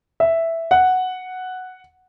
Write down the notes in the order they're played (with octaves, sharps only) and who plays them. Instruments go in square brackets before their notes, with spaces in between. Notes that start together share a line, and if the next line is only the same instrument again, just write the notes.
[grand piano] E5
F#5